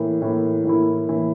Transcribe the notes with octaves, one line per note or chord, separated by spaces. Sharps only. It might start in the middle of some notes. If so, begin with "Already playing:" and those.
Already playing: A2 E3 A#3 E4
A2 E3 A#3 E4
A2 E3 A#3 E4
A2 E3 A#3 E4